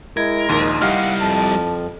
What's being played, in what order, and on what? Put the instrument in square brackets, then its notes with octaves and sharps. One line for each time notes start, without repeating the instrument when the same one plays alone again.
[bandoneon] G#3 [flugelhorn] E4 [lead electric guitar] A#4 [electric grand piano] G#6
[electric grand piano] A#1 D#2 C6 [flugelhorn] D#4
[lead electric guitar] G3 E4 [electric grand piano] G4 D#5 F6 [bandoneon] F5 F#5
[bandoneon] F2 [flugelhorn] A5